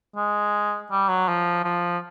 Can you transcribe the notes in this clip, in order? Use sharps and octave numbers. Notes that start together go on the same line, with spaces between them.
G#3
G3
F#3
F3
F3